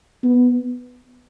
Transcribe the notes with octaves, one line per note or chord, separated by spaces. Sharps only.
B3